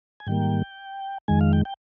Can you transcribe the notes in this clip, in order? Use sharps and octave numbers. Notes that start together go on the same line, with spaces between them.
G#5
G#2 D#3 G3 A#3 G5
F2 D#3 G#3 G#5
F5
G5
G5